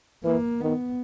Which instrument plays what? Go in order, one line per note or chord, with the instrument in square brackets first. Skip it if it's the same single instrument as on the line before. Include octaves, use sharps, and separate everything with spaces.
[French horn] E3 [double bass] A#3
[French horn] D#3 [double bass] B3